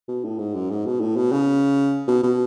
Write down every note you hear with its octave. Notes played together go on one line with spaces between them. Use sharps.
B2
A2
G#2
F#2
G#2
B2
A2
B2
C#3
B2
B2